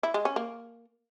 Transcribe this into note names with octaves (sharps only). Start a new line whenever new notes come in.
E4
G#3
C#4
A#3